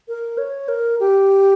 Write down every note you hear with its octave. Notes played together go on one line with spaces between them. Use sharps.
A#4
C#5
A#4
G4